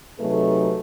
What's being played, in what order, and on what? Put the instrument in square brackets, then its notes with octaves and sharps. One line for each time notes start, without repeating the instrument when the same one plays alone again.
[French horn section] C3 F#3 A3 D#4 G#4 B4